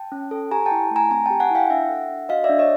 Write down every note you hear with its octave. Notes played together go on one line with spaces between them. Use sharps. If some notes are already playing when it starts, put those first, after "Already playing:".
Already playing: G5 A5
C#4
A4
G4 G#5 A#5
G5 A5
E4
A3
G#5 A#5
C4 G#5 A#5
G4 G5 A5
F#5 G#5
E4 F5 G5
D4 E5 F#5
A4
D4
F#4 D#5 F5
D5 E5
D4
C#5 D#5